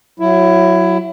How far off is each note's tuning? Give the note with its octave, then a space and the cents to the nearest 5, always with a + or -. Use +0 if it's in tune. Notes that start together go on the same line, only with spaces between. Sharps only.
F#3 -5 E4 +15